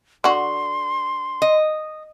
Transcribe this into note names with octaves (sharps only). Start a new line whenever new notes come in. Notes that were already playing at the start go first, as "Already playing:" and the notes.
D3 F#4 C6
D#5